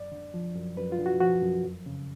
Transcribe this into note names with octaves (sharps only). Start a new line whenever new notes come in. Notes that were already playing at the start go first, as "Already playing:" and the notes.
Already playing: F#2 D5
D3
F3
F#2
F#2 B4
F4
D3
F#4
F3 F#4
F#2
F2
C#3